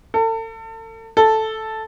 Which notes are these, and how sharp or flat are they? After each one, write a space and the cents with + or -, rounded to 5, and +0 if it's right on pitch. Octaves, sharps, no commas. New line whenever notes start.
A4 +35
A4 -5